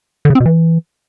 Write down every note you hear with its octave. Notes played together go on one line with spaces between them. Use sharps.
D3
C#3
C4
B2
E3